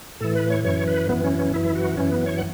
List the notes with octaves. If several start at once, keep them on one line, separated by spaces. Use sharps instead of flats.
A2 E3 A4
B4
C#5
F#2 E3 C#5
B4
F#2 E3 B3
C#4
C#4
F#2 E3 E4
F#4
F#2 E3 C#4
B3
C#5
F#5